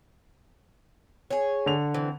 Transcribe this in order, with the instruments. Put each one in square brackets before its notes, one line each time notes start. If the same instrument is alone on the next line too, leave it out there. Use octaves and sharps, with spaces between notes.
[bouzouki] G#4 C#5
[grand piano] D3 F7
[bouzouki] E3 C4